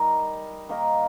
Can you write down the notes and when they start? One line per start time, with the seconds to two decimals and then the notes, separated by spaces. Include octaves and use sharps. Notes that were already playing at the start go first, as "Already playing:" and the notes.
Already playing: G3 D#4 A#4
0.69 D#3 A#3 D#4 A#4